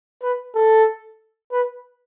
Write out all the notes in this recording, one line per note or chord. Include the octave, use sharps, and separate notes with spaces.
B4
A4
B4